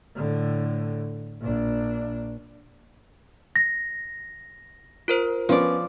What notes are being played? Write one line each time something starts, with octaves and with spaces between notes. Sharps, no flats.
A2 D3
A#1 D4
A#6
F4 A#4 C5
F3 B3 C#4 D5